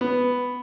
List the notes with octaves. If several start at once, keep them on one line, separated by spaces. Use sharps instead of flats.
B3